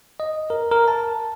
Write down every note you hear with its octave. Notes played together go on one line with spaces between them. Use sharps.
D#5
A#4
A#4
A5